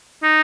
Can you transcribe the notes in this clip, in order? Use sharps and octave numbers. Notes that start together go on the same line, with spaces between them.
D#4